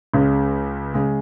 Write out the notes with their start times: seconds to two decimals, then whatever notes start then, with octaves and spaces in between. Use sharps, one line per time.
0.14 C#2 C#3 G#3
0.94 C#3 G#3